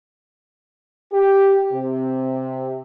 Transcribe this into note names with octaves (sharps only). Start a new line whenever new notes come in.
G4
C3